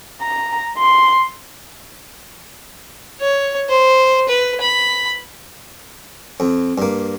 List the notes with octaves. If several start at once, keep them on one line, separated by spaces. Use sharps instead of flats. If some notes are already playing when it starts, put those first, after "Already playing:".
A#5
C6
C#5
C5
B4
B5
F2
G2 A#3